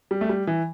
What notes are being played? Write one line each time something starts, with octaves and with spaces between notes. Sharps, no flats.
G3
A3
G3
E3